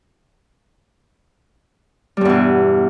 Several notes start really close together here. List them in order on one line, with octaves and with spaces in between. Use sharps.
G3 G2 E2 B2